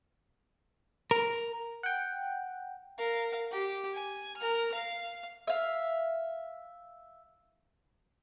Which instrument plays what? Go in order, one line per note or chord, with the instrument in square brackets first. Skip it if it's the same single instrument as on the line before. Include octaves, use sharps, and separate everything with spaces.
[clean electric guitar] A#4
[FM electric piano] F#5 G5
[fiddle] A#4 F5
G4
G#5
A#4 F6
F5
[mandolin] E5 F5